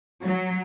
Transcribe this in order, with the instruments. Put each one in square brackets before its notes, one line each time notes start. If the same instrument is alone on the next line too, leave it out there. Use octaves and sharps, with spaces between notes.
[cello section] F#3